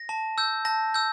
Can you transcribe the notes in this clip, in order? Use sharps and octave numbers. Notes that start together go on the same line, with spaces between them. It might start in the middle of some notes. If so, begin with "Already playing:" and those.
Already playing: A#6
A5
E6 G6
A5 A#6
E6 G6